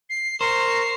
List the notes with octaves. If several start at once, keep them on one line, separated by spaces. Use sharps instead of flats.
C7
A#4 C5 A#5 C#6 C7